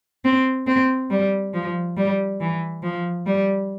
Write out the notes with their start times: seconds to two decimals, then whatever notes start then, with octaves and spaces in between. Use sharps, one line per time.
0.24 C4
0.67 C4
1.10 G3
1.54 F3
1.96 G3
2.40 E3
2.83 F3
3.26 G3